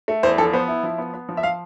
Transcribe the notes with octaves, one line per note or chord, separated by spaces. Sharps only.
A3
E2 C5
F3 A4
B3 C5
E4
F3
B3
B3
F3
E5
F3 F5